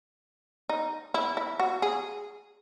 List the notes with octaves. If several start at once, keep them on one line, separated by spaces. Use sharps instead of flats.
D#4
E4
E4
F#4
G#4